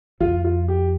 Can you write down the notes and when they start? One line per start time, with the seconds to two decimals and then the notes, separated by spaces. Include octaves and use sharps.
0.20 F2 F4
0.44 F4
0.68 G4